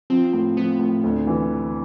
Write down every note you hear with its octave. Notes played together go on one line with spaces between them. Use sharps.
F3 C4
A2
F3 B3
A2
D2
E3